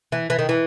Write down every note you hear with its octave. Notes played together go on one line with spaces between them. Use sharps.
E3
E3
D#3
E3